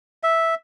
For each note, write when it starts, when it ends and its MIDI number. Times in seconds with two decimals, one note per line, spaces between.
0.23 0.55 76